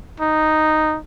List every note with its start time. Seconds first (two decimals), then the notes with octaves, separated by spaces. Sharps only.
0.20 D#4